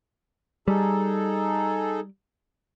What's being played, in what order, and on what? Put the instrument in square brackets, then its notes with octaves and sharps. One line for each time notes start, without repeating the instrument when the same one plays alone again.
[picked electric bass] G3 [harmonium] D#4 G#4 A4